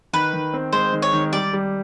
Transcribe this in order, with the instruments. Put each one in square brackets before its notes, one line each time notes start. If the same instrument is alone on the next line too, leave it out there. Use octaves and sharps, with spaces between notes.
[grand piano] D#3 [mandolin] B4
[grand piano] D#3
C4
[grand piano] G#3 [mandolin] C5
[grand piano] D#3
[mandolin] C#5
[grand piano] D#3
[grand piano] G3 [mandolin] D5
[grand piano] G3